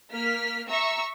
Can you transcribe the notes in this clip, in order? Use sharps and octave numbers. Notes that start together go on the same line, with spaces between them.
A#3 F6 B6
E5 A#5 C#6 E6